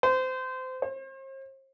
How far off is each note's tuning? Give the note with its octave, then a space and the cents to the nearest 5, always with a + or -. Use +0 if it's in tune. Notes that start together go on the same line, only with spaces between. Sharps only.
C5 -25
C5 +40